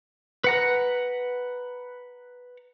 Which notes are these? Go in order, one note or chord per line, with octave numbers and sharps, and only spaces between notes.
B4 F#5 A#5